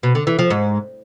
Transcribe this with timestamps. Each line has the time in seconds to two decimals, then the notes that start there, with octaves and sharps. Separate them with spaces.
0.03 B2
0.15 D3
0.27 E3
0.39 F3
0.50 G#2